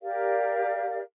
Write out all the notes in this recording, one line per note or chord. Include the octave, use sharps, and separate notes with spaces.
G4 A#4 D5 F5